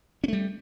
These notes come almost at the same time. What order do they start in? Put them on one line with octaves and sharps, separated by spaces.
C#4 A3 G3